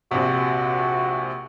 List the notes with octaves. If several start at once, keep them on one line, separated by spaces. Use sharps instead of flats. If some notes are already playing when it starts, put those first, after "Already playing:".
A#1 C3 F#4